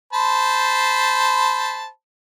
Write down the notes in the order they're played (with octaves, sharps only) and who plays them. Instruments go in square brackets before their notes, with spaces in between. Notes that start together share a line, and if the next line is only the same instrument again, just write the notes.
[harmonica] C5 A5 B5